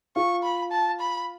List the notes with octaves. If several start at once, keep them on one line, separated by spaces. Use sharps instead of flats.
F4 C#6
B5
A5
B5